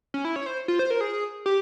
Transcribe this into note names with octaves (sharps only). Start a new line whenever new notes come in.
C#4
E4
C#5
C5
F4
C5
A#4
G#4
G4